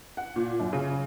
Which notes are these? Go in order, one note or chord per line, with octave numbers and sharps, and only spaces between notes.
F#5
A#2
F#2
C#3